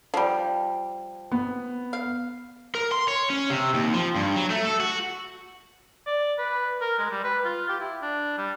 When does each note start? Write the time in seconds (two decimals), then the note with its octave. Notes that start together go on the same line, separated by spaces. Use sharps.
0.14 F3 G3
1.31 B3
1.93 F5
2.75 A#4
2.92 C6
3.08 C#5
3.30 C#4
3.50 C3
3.74 D#2
3.94 F3
4.16 G2
4.36 F#3
4.50 A3
4.65 A4
4.80 F#4
6.07 D5
6.38 B4
6.82 A#4
6.99 G#3
7.11 G3
7.24 B4
7.45 F4
7.69 G4
7.80 E4
8.02 D4
8.38 G3